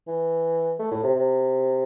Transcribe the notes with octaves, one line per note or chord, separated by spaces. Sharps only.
E3
A3
A2
C3
C3